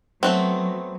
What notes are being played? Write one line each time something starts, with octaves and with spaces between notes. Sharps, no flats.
F#3 A3 B3 C4